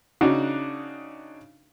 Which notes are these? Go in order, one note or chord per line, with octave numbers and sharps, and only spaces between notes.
C#3 D4 D#4 F#4